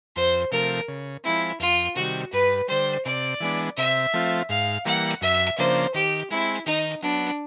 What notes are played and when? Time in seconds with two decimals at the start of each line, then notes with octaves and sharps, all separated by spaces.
0.16 F2 C5
0.52 C3 F3 A3 A#4
0.88 C#3
1.24 F3 G#3 C4 E4
1.60 F2 F4
1.96 C3 D#3 G3 F#4
2.33 G2 B4
2.68 D3 G3 C5
3.05 C3 D5
3.40 E3 G#3 B3 D4
3.77 C3 E5
4.14 F3 A3 C4 F4
4.49 G#2 F5
4.85 E3 G3 A#3 F#5
5.21 F#2 E5
5.58 C#3 F3 A#3 D4 C5
5.94 D#3 G4
6.30 G#3 C4 E4
6.66 D#3 D#4
7.02 F#3 B3 D4